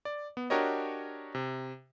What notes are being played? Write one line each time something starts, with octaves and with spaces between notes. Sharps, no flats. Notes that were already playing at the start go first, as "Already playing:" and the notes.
D5
B3
D4 F#4 G4 A#4 C#5 D#5
C3